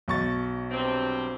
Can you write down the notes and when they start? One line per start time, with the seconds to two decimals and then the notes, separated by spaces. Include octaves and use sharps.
0.08 B1 C#6 A6
0.71 G2 C3 C4